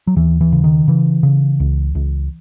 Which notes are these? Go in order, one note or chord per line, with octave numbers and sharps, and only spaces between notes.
F#3
D#2 E3
E3
C#3
D#3
C#3 E3
C#3
C#2
C#2